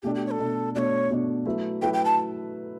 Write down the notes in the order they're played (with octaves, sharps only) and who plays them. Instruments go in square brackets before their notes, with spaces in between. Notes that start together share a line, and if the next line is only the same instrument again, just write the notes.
[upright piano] B2 A3 D4 [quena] G4
[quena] G4
C#5
A4
[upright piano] B2 A3 D4
[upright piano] B2 A3 D4 [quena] C#5 D5
[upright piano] B2 A3 D4
F#3 A3 E4 B4 E5
[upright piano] F#3 A3 E4 B4 E5 [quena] G5
[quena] G5
A5